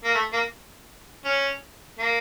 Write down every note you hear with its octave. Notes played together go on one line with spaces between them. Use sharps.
A#3
A3
A#3
C#4
A#3